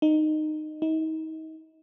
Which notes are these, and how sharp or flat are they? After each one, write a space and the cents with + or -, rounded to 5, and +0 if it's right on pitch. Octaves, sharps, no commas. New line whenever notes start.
D#4 -15
D#4 +35